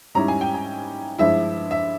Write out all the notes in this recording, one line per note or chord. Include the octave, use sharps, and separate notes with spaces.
G#2 G3 C#4 E4 A#5
G#5
G5
G#5
G2 F3 G#3 E4 E5
E5